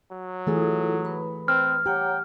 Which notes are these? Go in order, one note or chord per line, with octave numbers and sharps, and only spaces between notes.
F#3
E3 A3 E4 F4 G#4 A4
B4 B5
C4 F6
G4 C#5 F#5 G5 A#5